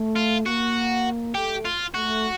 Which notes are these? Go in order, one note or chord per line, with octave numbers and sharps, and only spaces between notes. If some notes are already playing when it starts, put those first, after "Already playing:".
Already playing: A3
F4
A#3 F#4
A3 G4
F4
A3 F#4